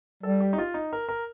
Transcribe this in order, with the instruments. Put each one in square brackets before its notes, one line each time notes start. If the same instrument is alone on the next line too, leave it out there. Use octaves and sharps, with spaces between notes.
[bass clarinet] G3 [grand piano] A4
[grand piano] G4
D#4
F4
D#4
A#4
A#4